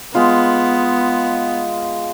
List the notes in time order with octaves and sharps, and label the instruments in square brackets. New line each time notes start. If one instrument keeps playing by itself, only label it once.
[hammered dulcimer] G#3 F4 [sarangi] B3